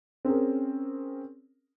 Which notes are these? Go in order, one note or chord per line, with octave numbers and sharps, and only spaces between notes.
C4 C#4 G#4 A#4